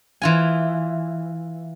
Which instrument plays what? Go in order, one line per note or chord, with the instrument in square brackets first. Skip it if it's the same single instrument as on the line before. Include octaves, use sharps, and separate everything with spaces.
[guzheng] E3 F4 G#5